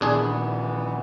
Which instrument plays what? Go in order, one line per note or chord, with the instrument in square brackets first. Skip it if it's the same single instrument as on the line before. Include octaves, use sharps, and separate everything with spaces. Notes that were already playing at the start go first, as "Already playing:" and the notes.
[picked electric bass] A#1 A#2 D#3 [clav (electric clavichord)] E2 D4 G#4 [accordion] E3 B3